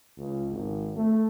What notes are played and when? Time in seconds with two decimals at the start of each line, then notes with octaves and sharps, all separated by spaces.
0.17 C#2
0.51 G#1
0.96 A3